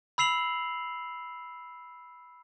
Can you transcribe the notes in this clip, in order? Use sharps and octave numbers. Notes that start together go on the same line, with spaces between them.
B5 E6 C7 F7 F#7